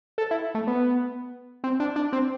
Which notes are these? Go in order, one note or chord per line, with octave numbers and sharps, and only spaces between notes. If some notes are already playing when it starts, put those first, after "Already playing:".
A4
E4
A3
B3
C4
D4
D4
C4